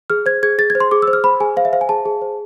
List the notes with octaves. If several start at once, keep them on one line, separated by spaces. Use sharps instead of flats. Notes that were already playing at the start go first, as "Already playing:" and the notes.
G#4 F6
C5 G#6
G#4 G#6
G#4 A6
G#6
C5
C6
G#4 D6
E6
C5
F6
C5 B5
G#4 G#5
C5 F5
E5
C5 F5
G#5
G#4 A5
G#4
C5